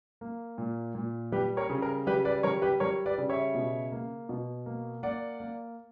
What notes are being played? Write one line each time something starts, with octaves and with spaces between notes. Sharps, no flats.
A#3
A#2
A#2
G3 G4 B4
A#4 C#5
C#3
A#4
G3 G4 B4
B4 D5
G3 A#4 C#5
G4 B4
G3 A#4 C#5
B4 D5
C#3
C#5 E5
B2
A#3
B2
A#3
A#3 D5 F#5
A#3